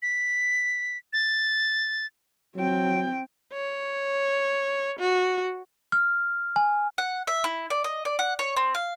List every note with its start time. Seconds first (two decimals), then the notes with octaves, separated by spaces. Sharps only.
0.02 B6
1.13 A6
2.56 F#3 C4 G5
3.54 C#5
4.99 F#4
5.92 F6
6.56 G#5
6.98 F#5
7.27 E5
7.44 E4
7.70 D5
7.84 D#5
8.05 D5
8.19 F#5
8.39 C#5
8.57 C4
8.75 F5